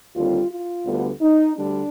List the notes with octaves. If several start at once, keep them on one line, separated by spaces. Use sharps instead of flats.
D#2 D3 G3 C4 F4
F4
D2 D3 G3 B3
D#4
D2 D3 G3 D4